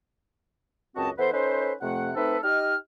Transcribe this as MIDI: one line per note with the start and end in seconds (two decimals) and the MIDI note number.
0.97 1.10 37
0.97 1.10 42
0.97 1.10 60
0.97 1.10 66
0.97 1.10 75
0.97 1.10 81
1.18 1.29 52
1.18 1.29 59
1.18 1.29 69
1.18 1.29 71
1.18 1.29 72
1.33 1.73 61
1.33 1.73 63
1.33 1.73 69
1.33 1.73 71
1.33 1.73 72
1.82 2.11 41
1.82 2.11 48
1.82 2.11 57
1.82 2.11 78
2.16 2.37 57
2.16 2.37 60
2.16 2.37 63
2.16 2.37 69
2.16 2.37 71
2.44 2.75 63
2.44 2.75 67
2.44 2.75 75
2.44 2.75 89